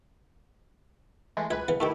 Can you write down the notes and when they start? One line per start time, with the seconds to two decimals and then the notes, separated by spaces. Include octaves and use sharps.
1.37 E3 G#3 A3
1.50 C#2 B4 E5 G#6
1.68 C#3 E3 B3
1.80 A2 D#3 A3 E4 G4